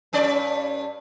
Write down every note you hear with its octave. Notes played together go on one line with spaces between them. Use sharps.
G2 C#4 D5